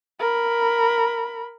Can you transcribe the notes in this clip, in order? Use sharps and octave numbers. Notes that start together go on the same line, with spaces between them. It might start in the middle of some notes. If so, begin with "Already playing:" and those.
A#4 B5